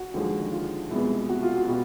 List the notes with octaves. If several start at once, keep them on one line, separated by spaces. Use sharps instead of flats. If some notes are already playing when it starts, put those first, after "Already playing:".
Already playing: F#4
D#2 D3 F3 G#3
F4
C2 B2 G#3 B3
F#4
F4
F#4
B2 G3